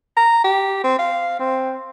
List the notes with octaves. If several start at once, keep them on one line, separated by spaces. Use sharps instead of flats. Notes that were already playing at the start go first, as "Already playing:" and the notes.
A#5
G4
C4
F5
C4